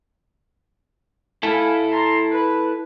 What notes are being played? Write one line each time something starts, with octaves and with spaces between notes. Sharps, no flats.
E4 A4 F5 G#5 B5
A5 A#5 C6
B4